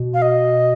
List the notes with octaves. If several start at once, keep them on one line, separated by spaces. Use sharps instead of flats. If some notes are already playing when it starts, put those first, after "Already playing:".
Already playing: B2
F5
D#5